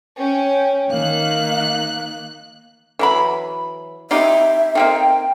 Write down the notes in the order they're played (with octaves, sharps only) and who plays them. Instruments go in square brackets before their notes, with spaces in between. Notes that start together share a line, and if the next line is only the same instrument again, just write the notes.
[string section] C#4 [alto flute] G5
[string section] D#3 A#3 F#6 [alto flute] F5
[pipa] E3 F#3 B5
[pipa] C4 D#4 G4 [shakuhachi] E5
[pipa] A#3 C4 D#4 [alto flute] G5